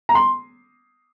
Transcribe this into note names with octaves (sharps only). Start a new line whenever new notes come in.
A#5
C6